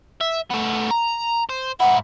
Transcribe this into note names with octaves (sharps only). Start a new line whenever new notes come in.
E5
A3 B3
A#5
C5
G#2 E4 F#5